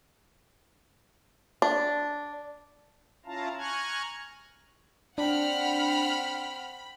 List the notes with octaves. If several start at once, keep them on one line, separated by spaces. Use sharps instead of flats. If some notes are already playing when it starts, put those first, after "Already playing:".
D4
C#4 E4 F4 F5 A5 A#5
G#5 A#5 C#6 F6 F#6 G#6
C4 D4 F#5 G5 B5 F6